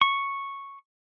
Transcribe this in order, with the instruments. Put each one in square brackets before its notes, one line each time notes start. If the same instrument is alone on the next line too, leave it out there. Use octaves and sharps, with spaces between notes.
[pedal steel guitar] C#6